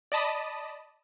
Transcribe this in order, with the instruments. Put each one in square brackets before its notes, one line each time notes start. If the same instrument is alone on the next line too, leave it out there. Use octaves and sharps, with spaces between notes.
[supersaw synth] D5 D#5 A5 B5 D#6